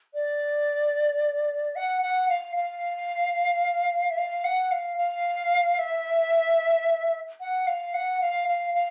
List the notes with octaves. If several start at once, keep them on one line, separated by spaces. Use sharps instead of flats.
D5
F#5
F#5
F5
F5
E5
F5
F#5
F5
F5
E5
F#5
F5
F#5
F5
F5
F5